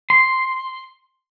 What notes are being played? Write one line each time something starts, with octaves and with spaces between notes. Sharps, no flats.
C6